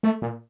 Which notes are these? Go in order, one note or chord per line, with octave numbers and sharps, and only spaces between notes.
A3
A#2